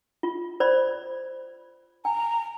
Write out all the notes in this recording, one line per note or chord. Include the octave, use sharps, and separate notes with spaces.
F4
C5 D5 B5
G#5 A#5